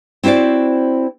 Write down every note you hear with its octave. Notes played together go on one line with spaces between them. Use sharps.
C4 E4 F#4 C5 D5